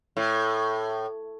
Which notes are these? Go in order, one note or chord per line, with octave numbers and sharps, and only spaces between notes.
A2